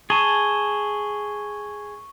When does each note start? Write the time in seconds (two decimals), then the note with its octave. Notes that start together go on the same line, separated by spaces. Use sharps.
0.10 G#4 A5 C#6 D#7 G7